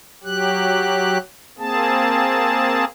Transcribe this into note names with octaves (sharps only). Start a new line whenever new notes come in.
F#3 G4 F#6
A#3 C4 G#4 A5